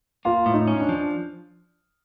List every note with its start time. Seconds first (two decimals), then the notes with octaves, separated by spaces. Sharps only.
0.25 A#3 F4
0.46 A2
0.54 D#4
0.67 C#4
0.81 D4
0.89 F3